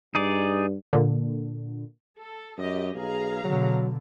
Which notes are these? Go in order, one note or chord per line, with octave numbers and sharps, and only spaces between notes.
G2 D#4 G#4 D5
A#2 D3
A4
F#2 G4 D#5
B1 G#4 F5 A#5
B2 D3 F#3